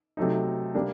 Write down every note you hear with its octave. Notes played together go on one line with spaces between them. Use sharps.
C3 F#3 A3 D#4
C3 G3 A#3 D4